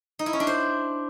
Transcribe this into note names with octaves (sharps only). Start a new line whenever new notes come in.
D#4
E4
C#4
D4
C5